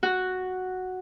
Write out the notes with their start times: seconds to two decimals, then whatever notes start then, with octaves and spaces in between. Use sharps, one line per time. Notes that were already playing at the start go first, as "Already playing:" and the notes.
0.03 F#4